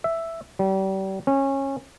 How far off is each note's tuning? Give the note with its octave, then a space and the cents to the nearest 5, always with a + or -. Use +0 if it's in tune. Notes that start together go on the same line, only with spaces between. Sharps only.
E5 +5
G3 -35
C#4 -20